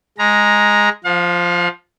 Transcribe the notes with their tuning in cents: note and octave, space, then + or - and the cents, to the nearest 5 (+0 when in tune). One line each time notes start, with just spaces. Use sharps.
G#3 +0 A#5 +10
F3 +0 F5 +40